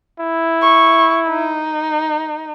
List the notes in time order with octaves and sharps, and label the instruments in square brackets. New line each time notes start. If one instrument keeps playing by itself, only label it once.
[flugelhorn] E4
[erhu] C#6
D#4